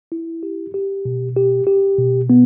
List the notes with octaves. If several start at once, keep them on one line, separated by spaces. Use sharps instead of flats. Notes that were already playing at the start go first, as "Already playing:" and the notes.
E4
G4
G4
B2
G4
G4
B2
B3